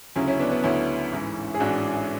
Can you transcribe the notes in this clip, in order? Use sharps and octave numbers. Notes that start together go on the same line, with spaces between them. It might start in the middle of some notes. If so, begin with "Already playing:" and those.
D2 C#3 F#3 C#4 E4
C#4 E4
B3 D4
B3 D4
D2 C#3 F#3 C#4 E4
A1 G#2 E3
G#4
A1 G#2 E3 D4 F#4